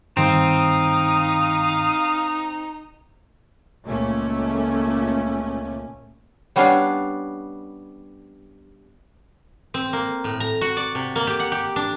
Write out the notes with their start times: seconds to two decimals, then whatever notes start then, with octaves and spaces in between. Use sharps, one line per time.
0.17 G2 D#3 C4 D#4 F5 D#6
3.85 C#2 A#2 A3 A#3 C#4
6.56 G3 B3 C#4 D4 F5
9.74 C4
9.93 A#3
10.24 A2
10.40 A#5
10.61 F#4
10.77 D5
10.95 C3
11.15 A#3
11.27 G4
11.40 F#5
11.52 G4
11.76 D4